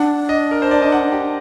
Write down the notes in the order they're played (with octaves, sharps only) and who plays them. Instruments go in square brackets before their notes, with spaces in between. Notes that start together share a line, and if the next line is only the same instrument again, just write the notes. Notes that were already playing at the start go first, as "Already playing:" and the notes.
Already playing: [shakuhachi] D4 [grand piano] F#5
[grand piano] D#5
A#4
C5
D5
D#5
F#5
G4